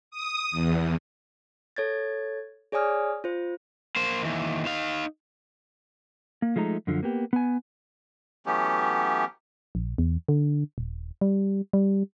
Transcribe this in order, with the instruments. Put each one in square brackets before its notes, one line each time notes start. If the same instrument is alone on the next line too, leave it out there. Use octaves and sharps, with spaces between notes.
[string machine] D#6
E2
[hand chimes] A4 C#5 G#6 A6
G#4 C#5 D5 G#5 D#6 F6
F4 C5
[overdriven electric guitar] A#3 C5
D#2 E3
D#4 F5
[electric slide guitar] A#3
F3 G#3 A3 D#4 A#5
F#2 D3 F3
A#3 B3 G4
B3 G#5
[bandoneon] E3 F#3 A3 B3 C#4 G4
[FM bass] A#1
E2
D3
D#1
G3
G3